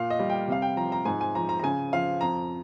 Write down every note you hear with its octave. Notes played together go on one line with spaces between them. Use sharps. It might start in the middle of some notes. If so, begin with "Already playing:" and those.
Already playing: A#2 F5
D#5
G3
G5
C3 F5
G5
F3 A#5
A#5
G#2 G#5
G#5
F3 A#5
A#5
A#5
C#3 G#5
F3 F5
F2 A#5